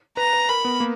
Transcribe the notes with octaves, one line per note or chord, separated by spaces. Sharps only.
B4 A#5
B4
A#4 B5
B3
A#3